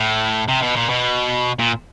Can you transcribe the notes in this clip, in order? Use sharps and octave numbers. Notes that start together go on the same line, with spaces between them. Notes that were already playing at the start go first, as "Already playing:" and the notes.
Already playing: A2
C3
B2
A#2
B2
A#2